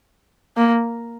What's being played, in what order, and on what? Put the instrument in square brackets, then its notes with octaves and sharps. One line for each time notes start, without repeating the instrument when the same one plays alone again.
[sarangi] A#3